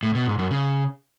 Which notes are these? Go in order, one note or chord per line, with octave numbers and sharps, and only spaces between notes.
A2
B2
G#2
F#2
C#3